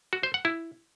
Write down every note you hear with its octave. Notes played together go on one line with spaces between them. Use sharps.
F#4
C5
F#5
E4